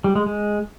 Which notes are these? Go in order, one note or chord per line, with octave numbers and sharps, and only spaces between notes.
G3
G#3
G#3